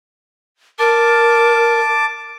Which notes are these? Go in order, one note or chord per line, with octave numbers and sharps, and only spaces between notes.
A#4 A5 D6